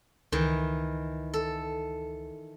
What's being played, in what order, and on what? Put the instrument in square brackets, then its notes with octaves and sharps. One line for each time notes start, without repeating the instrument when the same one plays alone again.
[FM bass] C#2 [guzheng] D#3 E3
[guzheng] A4